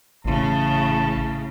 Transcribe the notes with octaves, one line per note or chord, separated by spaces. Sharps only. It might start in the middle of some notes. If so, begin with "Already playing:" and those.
A1 A2 C#3 A5